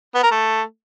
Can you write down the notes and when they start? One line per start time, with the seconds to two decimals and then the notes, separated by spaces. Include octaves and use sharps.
0.15 B3
0.23 A#4
0.31 A3